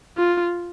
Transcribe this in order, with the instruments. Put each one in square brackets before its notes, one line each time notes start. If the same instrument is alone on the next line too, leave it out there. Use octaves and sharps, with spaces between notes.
[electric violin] F4